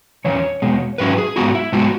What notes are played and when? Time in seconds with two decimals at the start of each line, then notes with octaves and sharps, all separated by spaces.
0.25 E2 E3 C#4 C#5
0.62 E2 B2 G#3
0.98 G#2 F#3 C#4 E4 B4
1.18 G#4
1.36 G#2 E3 B3 E4 F#4
1.50 F#4
1.55 E4
1.72 G#2 G#3 B3 E4 F#4